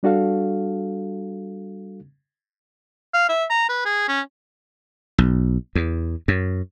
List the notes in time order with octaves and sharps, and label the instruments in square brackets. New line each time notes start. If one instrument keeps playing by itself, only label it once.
[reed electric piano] G3 D4 F#4 A4 F5
[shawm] F5
E5
A#5
B4
G#4
C#4
[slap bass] B1
E2
F#2